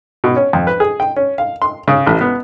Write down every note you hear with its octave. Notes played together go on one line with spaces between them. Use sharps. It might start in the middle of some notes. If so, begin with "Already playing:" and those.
B2
C#4
F2
B4
G#4
G5
C#4
F5
C6
C#3
A1
B3